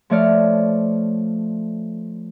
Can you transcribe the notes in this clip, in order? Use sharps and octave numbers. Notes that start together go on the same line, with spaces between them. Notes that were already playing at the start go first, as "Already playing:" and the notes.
F3 A3 C#5 D5 F6